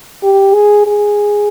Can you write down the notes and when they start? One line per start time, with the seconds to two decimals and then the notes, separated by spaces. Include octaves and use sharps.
0.23 G4
0.55 G#4
0.87 G#4